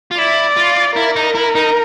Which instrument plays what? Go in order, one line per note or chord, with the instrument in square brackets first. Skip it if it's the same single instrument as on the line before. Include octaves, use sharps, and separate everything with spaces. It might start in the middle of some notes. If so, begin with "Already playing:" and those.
[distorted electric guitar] F4
[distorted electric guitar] E4 [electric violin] D5
[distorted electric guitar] F4
[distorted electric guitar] E4 [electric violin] A#4
[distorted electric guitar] D#4
E4
D#4